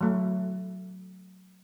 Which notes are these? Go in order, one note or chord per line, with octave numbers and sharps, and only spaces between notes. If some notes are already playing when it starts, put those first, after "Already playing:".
F#3 A3